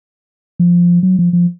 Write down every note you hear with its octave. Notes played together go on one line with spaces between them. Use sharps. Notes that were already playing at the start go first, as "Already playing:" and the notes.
F3
F#3
F3
F3